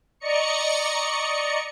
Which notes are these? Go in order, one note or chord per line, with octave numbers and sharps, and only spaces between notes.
D5 D#5 A#5 C#6 C#7